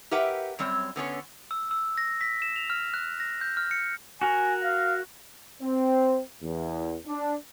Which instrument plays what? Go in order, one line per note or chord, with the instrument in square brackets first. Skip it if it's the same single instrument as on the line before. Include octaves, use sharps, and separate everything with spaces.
[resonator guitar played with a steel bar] G4 A#4 B4 E5 F#5 G5
F#2 G3 C4 C#5
D3 B3 C#4 C#5
[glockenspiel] E6
E6
A#6
B6
E7
F7
F6
F#6
A#6
G6
F6
C#7
[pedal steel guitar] F#4 A#4 [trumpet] G#5
[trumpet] F5
[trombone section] C4
E2
D4